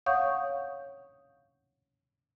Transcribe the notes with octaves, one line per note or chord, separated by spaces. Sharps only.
C#5 F5 F#5 C#6 D#6 G6